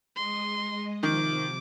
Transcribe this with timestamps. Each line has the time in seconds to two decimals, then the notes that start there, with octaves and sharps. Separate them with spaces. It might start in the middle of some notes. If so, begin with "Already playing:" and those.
0.16 G#3 D#5 C6
1.03 C3 D#3 F3 D6